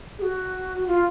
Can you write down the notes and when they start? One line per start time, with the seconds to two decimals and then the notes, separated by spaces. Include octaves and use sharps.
0.19 G#4
0.22 F#4
0.87 F4